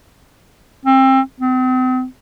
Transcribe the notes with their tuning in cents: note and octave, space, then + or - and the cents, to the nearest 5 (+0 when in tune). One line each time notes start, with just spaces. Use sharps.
C4 +25
C4 -40